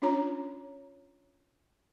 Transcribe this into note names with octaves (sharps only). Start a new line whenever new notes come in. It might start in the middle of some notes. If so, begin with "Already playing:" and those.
C#4 D4 F4 C#5 A#5